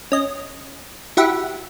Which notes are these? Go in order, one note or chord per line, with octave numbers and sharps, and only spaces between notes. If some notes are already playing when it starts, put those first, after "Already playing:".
C#4 D#5
E4 F#4 G4 E5 F#5 B5